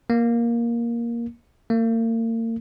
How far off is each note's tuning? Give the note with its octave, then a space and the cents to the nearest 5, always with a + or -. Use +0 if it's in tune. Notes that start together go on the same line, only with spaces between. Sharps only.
A#3 +10
A#3 -40